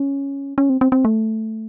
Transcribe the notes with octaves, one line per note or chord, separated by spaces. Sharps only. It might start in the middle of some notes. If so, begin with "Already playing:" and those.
Already playing: C#4
C#4
C4
C4
C4
A3